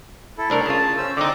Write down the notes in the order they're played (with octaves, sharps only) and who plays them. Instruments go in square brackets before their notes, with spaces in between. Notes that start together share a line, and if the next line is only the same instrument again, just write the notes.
[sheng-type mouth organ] E4 A4
[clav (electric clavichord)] C2 D4 A#4 [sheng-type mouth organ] A3 A4
[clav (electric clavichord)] C#3 F4 [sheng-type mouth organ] A5
[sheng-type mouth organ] C#4 C5 E6
[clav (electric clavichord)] D3 D#4 [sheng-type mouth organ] C4 D5 D6